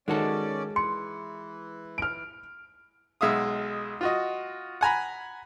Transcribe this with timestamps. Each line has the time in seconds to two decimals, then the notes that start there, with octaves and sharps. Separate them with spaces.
0.08 D#3 G#3 C#4 F#4 A4 D5
0.76 E3 C6 C#7
1.98 F6 D7
3.21 B1 G#3 E5 F5 D#6
4.01 F4 F#4 D#5
4.81 F#5 G#5 A#5 B5